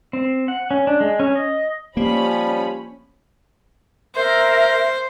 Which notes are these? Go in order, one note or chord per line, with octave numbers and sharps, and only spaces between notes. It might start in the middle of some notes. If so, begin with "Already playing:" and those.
C4
F#5
C#4
D4
G#3
C#4
D#5
F3 G3 A#3 C#4 B5
A#4 C5 E5